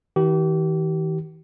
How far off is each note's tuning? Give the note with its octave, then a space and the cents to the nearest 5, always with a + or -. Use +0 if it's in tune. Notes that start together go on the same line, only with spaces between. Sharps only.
D#3 +45 G4 -35